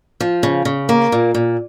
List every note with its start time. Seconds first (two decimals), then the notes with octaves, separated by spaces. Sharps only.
0.20 F3
0.43 C#3
0.65 C#3
0.89 A#3
1.12 A#2
1.35 A#2